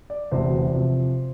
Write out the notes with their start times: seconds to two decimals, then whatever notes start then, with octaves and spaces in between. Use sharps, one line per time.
0.10 D5
0.31 E1 D2 C3 E3 C5
0.74 C3 F3